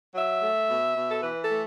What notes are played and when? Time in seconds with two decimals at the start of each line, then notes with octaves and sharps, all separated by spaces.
0.14 F#3 E5
0.41 A3
0.68 B2
0.95 B2
1.10 A4
1.22 E3 B4
1.40 A4
1.49 A3